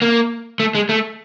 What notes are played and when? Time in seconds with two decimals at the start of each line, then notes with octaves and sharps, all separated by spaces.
0.02 A#3
0.60 A3
0.75 G#3
0.89 A3